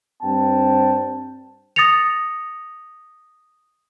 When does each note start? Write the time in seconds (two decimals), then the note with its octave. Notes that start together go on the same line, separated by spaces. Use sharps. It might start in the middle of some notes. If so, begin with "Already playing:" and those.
0.23 G2 C4 G5 A5
1.76 D#6 A6 A#6 C#7 F7